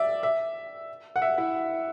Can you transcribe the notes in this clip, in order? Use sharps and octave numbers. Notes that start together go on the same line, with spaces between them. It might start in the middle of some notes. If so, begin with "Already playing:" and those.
Already playing: D5 E5
E5
F#5
E5
E4